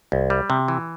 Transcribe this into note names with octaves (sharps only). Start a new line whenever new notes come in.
C2
G3
C3
E3